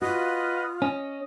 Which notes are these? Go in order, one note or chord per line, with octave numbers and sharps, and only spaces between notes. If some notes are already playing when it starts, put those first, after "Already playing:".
F4 F#4 B4 D#5 F#5
C#4 D#5